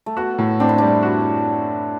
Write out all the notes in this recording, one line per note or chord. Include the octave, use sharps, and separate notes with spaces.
A3
B3 F#4
A2
C4 D4
E4
G3 D4
F#4